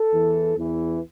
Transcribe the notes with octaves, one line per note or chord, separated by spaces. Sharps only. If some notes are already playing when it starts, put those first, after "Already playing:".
Already playing: A4
E2 E3
E2 E3